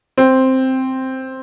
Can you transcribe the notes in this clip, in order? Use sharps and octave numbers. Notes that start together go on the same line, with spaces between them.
C4